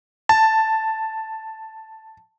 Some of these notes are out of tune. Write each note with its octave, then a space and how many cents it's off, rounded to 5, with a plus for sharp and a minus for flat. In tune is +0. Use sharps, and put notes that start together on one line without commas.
A5 +5